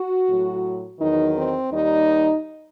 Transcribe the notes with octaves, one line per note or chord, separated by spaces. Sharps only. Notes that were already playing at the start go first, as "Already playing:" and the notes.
Already playing: F#4
A2 F#3
E2 D#3 F#3 D#4
C4
D#2 D#3 G3 D#4